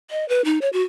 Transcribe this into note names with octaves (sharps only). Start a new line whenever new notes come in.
D#5
B4
D#4
C#5
F#4